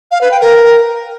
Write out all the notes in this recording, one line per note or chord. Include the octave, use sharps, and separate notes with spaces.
F5
B4
G5
A#4